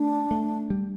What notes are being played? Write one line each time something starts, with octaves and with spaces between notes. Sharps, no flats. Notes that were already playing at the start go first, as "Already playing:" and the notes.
Already playing: A3 D4
A3
G3